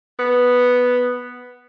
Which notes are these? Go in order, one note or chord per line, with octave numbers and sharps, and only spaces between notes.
B3